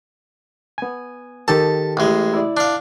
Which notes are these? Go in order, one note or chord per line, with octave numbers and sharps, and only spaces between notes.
B3 G#5
D#3 G4 A4 A5
A1 G#3
E4 D5
D4 F5